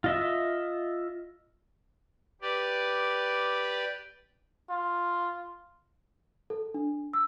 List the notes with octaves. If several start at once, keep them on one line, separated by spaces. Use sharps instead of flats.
F4 D#5 E5
G4 B4 D5
F4
A4
D4
E6